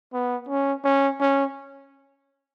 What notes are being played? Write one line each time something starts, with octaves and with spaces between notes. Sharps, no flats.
B3
C#4
C#4
C#4